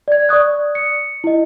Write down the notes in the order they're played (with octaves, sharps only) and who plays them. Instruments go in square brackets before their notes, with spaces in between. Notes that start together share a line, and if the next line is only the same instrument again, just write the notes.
[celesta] D5 G#6
D5 C#6 D#6 F#6
C#7
E4 D#5